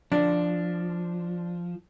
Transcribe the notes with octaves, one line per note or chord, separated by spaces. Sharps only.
F3 D4